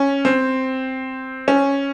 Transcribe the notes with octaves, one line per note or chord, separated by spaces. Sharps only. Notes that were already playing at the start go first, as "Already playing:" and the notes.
Already playing: C#4
C4
C#4